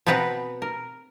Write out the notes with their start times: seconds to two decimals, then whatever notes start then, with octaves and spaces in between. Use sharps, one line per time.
0.06 B2 B3 C4 B4 F#5 A#5
0.62 A#4